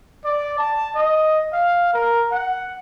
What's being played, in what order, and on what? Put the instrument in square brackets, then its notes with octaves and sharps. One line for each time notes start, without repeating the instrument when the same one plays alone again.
[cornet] D5
A5
D#5
F5
A#4
F#5